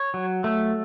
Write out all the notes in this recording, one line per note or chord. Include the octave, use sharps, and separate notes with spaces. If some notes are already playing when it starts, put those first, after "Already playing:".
Already playing: C#5
F#3
A3